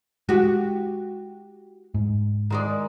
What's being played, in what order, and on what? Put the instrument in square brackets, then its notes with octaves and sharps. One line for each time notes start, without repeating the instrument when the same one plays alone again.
[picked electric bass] G#3 [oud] F#4 G4
[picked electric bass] G#2
[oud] D#3 G#3 D5